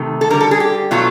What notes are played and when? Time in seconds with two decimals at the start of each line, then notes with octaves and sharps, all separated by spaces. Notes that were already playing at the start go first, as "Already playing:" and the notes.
Already playing: C3 D#3 A3
0.21 A4
0.30 D3 G3 A#4
0.41 A4
0.51 G#4
0.60 G4
0.91 B2 F#3 A3 F4